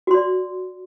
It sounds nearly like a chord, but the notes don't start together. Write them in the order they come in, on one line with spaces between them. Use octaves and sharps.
F#4 C6 D5